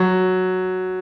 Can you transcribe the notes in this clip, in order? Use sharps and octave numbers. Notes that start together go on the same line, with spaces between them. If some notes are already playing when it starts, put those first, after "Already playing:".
Already playing: F#3